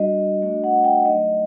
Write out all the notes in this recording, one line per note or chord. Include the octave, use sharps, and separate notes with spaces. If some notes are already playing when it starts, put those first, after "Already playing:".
Already playing: G3 D4 F#4 D#5
A3 D4 F#4 D#5
F#5
G5
F#3 A3 D#4 D#5